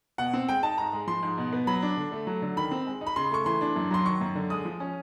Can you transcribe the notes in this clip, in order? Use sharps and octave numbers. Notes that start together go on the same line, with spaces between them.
B2 F#5
C4
G#3 G5
D#4 A5
G#2 A#5
G#3
F3 C6
G#2
B2
B3
F#3 B5
D4
D3
A3
F#3
D3
D#3 B5
C4
G#3
D#4
B5
C#3 C6
A3 C#6
E3 C6
D4
F#2
F#3 C6
D#3 C#6
F#2
D3
G#3 D#6
F3
C#4